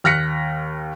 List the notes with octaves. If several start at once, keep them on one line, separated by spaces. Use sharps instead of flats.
D#2 F6 F#6 A#6 B6 C#7